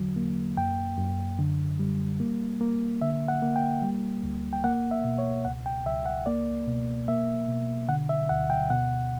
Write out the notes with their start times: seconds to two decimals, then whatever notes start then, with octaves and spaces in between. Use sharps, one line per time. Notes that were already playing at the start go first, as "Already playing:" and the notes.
Already playing: E2 D3 F#3
0.16 A#3
0.57 F#2 G5
0.98 F#2
1.39 D3
1.79 G3
2.20 A#3
2.61 A#3
3.02 D3 E5
3.28 F#5
3.42 A#3
3.56 G5
3.82 G3
4.23 D2
4.53 G5
4.64 A#3 F#5
4.91 E5
5.04 B2
5.18 C#5
5.45 C#2 F#5
5.66 G5
5.86 C#2 E5
6.06 F#5
6.26 A#3 D5
6.67 B2
7.08 A#3 E5
7.48 B2
7.89 D3 F#5
8.09 E5
8.29 D2 F#5
8.50 G5
8.70 B2 F#5